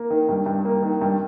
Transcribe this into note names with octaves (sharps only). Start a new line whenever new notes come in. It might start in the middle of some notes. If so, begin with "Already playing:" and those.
Already playing: A#3
D#3
G2
G2
A#3
D#3
G2